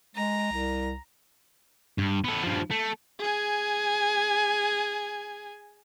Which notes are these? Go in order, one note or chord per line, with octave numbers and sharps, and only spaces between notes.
G#3 A#5
C2
G2
B3 A4
G2 F3
A3
G#4 G#5